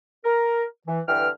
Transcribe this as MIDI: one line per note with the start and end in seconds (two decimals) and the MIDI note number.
0.24 0.64 70
0.87 1.00 52
1.08 1.28 43
1.08 1.28 50
1.08 1.28 52
1.08 1.28 79
1.08 1.28 89